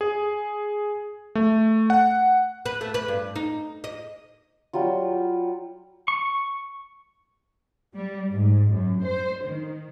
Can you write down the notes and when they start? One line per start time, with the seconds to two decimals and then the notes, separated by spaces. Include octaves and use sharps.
0.01 G#4
1.35 A3
1.90 F#5
2.66 B4
2.81 A3
2.94 B4
3.08 G2
3.36 D#4
3.84 D#5
4.73 F#3 G3 F4
6.08 C#6
7.95 G3
8.31 G#2
8.72 F#2
9.05 C5
9.44 D#3